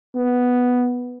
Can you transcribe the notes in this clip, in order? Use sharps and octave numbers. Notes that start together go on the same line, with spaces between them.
B3